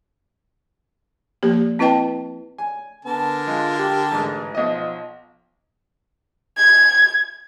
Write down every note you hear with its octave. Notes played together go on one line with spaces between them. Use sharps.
F3 A#3 G4
C4 E4 B4 D#5 G5 A5
G#5
D3 B3 A#4 A5
G#3 F4
G4
A1 G#2 E3
B1 F3 D#5
G#6